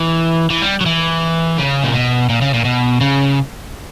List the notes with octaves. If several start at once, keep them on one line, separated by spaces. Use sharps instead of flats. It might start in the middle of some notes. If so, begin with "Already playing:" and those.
Already playing: E3
E3
G3
F#3
E3
C#3
A#2
B2
A#2
C#3
A#2
B2
C#3